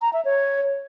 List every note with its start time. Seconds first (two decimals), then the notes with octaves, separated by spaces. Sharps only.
0.02 A#5
0.13 E5
0.25 C#5